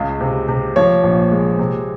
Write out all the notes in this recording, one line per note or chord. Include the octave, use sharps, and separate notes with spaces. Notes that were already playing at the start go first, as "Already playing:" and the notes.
Already playing: C#2 C#3
C3
C3
F3 C#5
A#1
G#3
C3